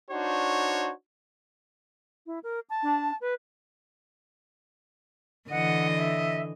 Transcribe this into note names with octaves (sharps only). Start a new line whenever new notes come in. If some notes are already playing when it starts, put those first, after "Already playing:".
D4 D#4 F#4 C5 C#5
E4
A#4
A5
D4
B4
D3 E3 D#5 F#5
E5